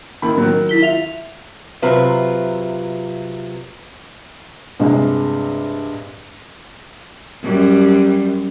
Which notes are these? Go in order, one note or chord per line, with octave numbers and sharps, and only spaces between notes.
D#3 E4 B5
D#3 F#3
E4 B6 G7
F4 E5 F7
C3 F#3 F4 B4 E5
G2 C3 G#3
F#2 G3